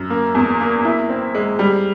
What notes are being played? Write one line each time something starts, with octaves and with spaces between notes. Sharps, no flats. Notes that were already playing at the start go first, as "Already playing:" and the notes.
Already playing: F#2
A#3
E2
A#3
E4
C4
G#3
G3